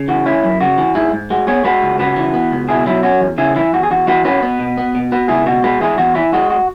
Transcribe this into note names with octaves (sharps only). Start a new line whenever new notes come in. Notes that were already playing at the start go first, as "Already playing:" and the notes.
Already playing: C#3
E3 F#4
C#4 E4
F#2
C#3 F#4
E3
G#2 E4 G#4
G#2
G#3 F#4
B3 G#4 C#5
G#3 F#4 B4
C#2
C#3 F#4 B4
E3
B3
C#2
B2 E4 G#4
F#3 E4
C#4 F#4
E2
C#3 E4 G#4
E3 E4
E2 F#4
G#4
E2 F#4
E3 F#4 B4
C#4 F#4 B4
B3
B2
B3
B2
B3 F#4 B4
C#2 E4 G#4
B2 F#4
G#3 F#4 B4
E2 E4 G#4
E2 F#4
E3 E4
G#3 F#4
F#4